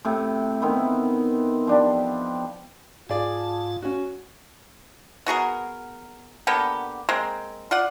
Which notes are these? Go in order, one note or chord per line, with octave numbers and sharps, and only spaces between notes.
A2 C3
D#3 B3 C4 E4
F3 D4 G4
G#2 F4 G#4 D5 A5
C#4 F#4
B3 F#4 G#4 A#4
D3 A#3 B3 G4
G#3 A#3 C4
F4 D5 F#5